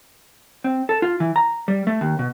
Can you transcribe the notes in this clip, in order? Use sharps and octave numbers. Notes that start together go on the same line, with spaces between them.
C4
A4
F4
E3
A#5
G3
A3
D#2
B2